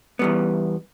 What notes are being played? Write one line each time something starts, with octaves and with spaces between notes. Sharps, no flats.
E2 G3 B3